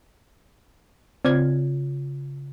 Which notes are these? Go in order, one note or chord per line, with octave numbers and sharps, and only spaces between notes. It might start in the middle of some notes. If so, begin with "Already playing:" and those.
C#3 C4 F4 D5 F6 G#6